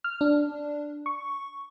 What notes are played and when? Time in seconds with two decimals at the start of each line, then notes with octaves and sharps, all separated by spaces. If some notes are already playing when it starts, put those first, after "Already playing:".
0.04 F6
0.21 D4
1.06 C#6